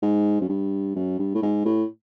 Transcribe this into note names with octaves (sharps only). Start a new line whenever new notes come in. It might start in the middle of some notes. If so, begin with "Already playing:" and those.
G#2
F#2
G2
F#2
G2
A2
G#2
A2